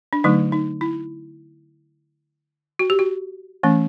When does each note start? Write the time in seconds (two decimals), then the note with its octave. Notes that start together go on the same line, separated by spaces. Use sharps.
0.13 D4
0.24 D3 F#3 A3 D#4
0.52 D#4
0.81 E4
2.79 F#4
2.90 G4
2.99 F#4
3.63 E3 A3 C#4